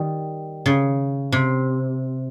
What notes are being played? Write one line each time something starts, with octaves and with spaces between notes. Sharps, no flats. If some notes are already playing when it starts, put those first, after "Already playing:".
Already playing: D#3 G3
C#3
C3